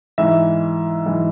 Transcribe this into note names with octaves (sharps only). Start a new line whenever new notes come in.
G#2 E3 E5
G#2 E3